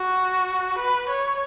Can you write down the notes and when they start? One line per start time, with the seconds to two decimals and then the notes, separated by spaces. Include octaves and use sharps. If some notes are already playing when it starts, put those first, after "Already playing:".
Already playing: F#4
0.78 B4
1.09 C#5